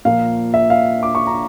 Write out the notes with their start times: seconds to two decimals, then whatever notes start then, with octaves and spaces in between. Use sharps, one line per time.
0.05 A#2 F3 A#3 F5
0.54 E5
0.70 F5
1.03 D6
1.15 C#6
1.27 A#5